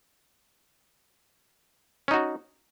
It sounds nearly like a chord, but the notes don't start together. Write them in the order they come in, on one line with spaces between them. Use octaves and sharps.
C#4 D#4 F#4